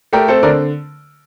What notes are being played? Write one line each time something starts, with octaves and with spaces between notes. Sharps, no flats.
A3 G4 A#4
C4 A4 C5
D3 A#4 D5